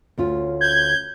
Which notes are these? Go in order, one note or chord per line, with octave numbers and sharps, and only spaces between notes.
D2 C#4 F4
G6 G#6